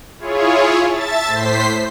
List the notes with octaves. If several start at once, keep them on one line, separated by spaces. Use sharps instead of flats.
E4 F4 G#4 C#5
E5 A5 A6
A2 C5 B6 C7